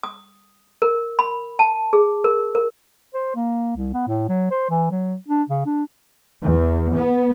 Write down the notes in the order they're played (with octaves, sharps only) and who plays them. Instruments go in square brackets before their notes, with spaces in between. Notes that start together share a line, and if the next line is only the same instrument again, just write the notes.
[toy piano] D#6
A#4
B5
A5
G#4
A#4
A#4
[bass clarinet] C5
A#3
C2
B3
A2
F#3
C5
E3
F#3
D4
C#3
D4
[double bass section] E2
B3